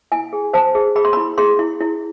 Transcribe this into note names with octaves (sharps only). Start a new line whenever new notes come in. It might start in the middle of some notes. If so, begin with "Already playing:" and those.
E4 G#5
G#4
C5 A5
G#4
G#4 B5
C6
E4 B5
G#4 C6
E4
E4